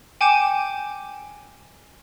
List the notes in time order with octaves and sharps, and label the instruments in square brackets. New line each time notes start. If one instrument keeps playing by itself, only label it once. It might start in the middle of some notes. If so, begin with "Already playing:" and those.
[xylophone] G5 G#5 D6 G6 C#7 E7